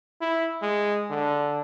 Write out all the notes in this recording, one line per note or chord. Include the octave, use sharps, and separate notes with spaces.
E4
G#3
D3